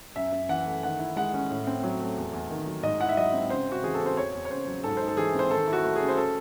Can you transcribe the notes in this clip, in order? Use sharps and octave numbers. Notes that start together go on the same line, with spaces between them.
F#2 E5
F#2
E3 F#5
A3
D#3 F#5
E4
G#3 F#5
C#4
A2
C4
F#3
A3
E2
E2
D#3
F#3
G#2 D#5
E4 F#5
E5
F#3 D#5
C4
C#3 C5
C#3 F#4
E3 G#4
A4
C4
C5
E2 C#5
E2
C#5
C#3 C5
F#3
G#2 A4
D#4 C5
A4
E3 G#4
C4 C5
D#3 A4
E4
F#4
A3
C#4 G#4
C5
A4